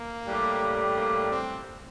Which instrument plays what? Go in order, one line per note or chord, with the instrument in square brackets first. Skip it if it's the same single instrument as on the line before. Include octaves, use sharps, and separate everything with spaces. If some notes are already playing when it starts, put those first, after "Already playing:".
Already playing: [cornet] A#3
[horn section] A2 G3 D4 G4
[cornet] A#3
C4